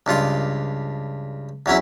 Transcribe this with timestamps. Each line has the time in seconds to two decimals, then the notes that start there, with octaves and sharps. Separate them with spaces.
0.06 C#2 G2 F4 C6
1.66 E2 F#3 C#4 E4